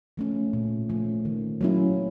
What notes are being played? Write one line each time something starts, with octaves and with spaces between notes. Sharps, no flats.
F3 A3 C#4
A#2
F3 A3 C#4
D#3
F#3 A#3 C#4 E4